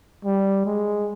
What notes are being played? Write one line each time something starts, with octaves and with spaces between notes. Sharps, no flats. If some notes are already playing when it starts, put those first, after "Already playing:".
G3
G#3